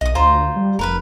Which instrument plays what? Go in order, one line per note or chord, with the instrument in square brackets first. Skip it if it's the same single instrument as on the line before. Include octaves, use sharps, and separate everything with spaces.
[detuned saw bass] B1 [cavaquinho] D#5 D#6
[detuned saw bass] D2 [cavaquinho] F4 C5 A#5
[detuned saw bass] G3
[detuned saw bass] F1 [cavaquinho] A#4 B4 B5